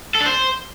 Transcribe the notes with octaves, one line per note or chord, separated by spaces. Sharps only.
A4
D4
C5